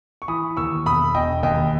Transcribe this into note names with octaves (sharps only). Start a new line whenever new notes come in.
C#6
E3 B5 D#6
D#2 C#6 E6
E1 B5 D#6
E1 D#5 G5
D#2 D#5 G5